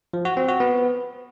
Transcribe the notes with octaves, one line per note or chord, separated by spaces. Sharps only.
F3
F#4
C4
F#4
B3